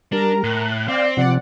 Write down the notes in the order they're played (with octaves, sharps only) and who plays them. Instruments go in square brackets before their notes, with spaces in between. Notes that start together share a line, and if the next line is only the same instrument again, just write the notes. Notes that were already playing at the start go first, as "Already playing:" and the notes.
[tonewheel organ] G3 [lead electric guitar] D4 [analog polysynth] A#4 A#5
[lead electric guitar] A2 [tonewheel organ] F#6
[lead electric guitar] C4 [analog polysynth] D5 [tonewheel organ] F5 G5
[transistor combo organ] C3 [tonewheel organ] F3 [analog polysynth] D5 F#5